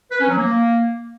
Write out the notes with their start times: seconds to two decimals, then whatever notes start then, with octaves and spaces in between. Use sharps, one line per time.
0.12 B4
0.20 C#4
0.29 F#3
0.37 A#3